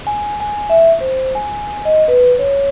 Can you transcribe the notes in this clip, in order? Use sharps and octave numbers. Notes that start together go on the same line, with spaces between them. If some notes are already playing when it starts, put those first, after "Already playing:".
G#5
G#5
E5
C5
G#5
D#5
B4
C#5